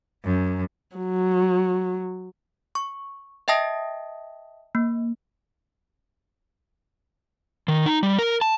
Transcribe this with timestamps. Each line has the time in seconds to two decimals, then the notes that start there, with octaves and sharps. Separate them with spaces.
0.25 F#2
0.96 F#3
2.75 C#6
3.48 D#5 E5 G5 A5 D#6 A#6
4.75 A#3
7.68 D#3
7.86 D#4
8.03 G3
8.19 A#4
8.41 A5